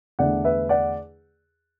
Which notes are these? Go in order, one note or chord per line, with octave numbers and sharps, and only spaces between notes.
E2 D3 A3 D5 F#5
B4 E5
D5 F#5